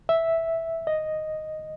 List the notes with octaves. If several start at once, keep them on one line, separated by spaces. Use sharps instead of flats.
E5
D#5